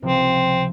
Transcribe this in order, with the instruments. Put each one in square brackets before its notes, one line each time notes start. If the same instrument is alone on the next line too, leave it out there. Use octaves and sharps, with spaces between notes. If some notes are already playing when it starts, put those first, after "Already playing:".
[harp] C#2 C3 F3 [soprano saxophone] C4